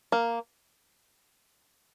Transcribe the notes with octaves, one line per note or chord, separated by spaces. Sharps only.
A#3